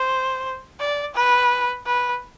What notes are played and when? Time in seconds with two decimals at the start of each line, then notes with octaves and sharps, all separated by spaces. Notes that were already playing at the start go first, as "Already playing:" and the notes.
Already playing: C5
0.80 D5
1.15 B4
1.86 B4